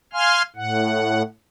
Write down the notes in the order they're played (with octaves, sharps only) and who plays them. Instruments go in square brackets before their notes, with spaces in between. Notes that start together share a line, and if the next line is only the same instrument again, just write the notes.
[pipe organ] F5 G#5 C6 F6
A2 F#5